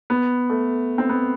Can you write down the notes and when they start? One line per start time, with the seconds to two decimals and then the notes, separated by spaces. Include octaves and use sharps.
0.10 B3
0.50 A3
0.98 C4
1.09 B3